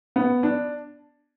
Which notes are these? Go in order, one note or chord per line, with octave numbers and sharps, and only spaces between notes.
B3
D4